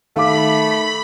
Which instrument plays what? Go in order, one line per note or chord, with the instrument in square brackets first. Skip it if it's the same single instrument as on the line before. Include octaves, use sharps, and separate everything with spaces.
[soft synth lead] D#3 [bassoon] A3 [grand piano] F5 D6 [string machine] B5